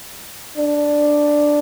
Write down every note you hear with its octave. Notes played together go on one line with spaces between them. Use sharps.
D4